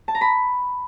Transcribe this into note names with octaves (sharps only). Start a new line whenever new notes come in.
A5
A#5
B5